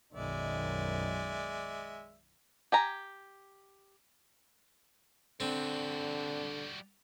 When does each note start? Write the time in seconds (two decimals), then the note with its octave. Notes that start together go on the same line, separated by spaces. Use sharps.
0.14 B1 F#2 D#3 G#3 D5 E5
2.72 G4 G#5 A#5
5.40 D3 G3 C4 F#4